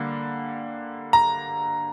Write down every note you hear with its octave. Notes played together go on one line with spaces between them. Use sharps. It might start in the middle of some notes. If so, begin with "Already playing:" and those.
Already playing: D3 G3 A#3
A#5